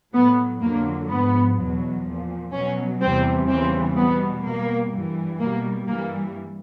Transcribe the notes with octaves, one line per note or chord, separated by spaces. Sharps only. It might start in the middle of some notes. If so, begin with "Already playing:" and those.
A2 F#3 B3
F2 D3 F#3 A#3
G#2 F3 B3
E2 B2 F#3
A#2 F3
B2 F#3 C#4
E2 C3 E3 G3 C4
E2 C#3 E3 G3 C4
B2 G3 B3
B2 G3 A#3
G2 E3 G3
B2 G3 A#3
G2 E3 G3 A#3